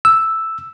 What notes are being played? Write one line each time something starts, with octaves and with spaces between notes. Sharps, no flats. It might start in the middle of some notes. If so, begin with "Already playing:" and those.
E6